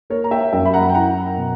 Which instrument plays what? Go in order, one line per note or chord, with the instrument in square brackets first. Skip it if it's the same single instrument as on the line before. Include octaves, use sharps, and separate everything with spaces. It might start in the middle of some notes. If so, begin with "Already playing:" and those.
[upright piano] A#3 [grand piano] A#4 C#5
[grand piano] A#5
E5 G5
[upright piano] F#2 [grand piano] E5 G5
[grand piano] B5
F#5 A#5
G5
[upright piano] E4 [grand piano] F#5 A#5
[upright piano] B2